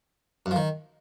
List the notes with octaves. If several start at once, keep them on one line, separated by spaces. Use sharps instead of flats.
F#2
F3
D#3